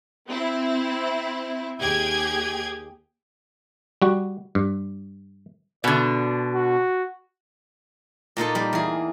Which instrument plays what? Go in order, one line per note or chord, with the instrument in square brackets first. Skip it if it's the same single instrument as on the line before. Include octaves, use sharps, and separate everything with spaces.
[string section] C4 E4
D#2 G4 G#4 G5 G#5 G#6
[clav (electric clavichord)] G3 F#4
G2
[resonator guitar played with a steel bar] B2 D3 [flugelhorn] D5
[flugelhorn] F#4
[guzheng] A#2 A#3 D#4 A4
G3 A#3
E2 G#4